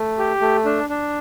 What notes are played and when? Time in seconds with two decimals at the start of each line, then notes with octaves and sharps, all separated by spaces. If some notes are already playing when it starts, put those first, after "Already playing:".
Already playing: A3
0.18 G4
0.41 A3
0.65 D4
0.89 D4